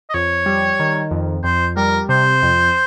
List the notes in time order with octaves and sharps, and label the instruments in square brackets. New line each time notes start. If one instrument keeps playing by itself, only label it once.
[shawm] D#5
[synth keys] F2 [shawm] C#5
[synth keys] G3
D#3
F2
[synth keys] F2 [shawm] C5
[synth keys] G3 [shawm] A#4
[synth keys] C3 [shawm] C5
[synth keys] F2